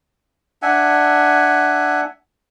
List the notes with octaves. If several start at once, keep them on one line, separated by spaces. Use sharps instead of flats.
D4 E5 F#5 G#5